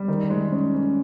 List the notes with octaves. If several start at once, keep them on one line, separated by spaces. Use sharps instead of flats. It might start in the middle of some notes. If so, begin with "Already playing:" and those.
Already playing: G3
D#3
G#3
C#4
C#4